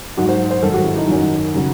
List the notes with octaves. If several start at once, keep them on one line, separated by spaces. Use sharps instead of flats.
G#2 F#3 F#4
C5
C5
G#2 D#3 F#3 A4
F#4
E4
D#4
F#2 D#3 F#3
C#3 F#3